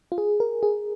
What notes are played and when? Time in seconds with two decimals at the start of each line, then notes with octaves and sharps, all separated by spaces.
0.12 F4
0.18 G#4
0.40 A#4
0.63 G#4